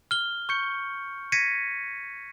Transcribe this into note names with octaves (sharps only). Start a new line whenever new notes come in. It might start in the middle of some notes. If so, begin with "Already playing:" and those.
F6 G7
C#6 G6 C#7
G#6 A#6 B6 C#7 D#7